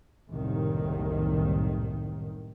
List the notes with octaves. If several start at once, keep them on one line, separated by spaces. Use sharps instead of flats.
F#1 C2 A2 D#3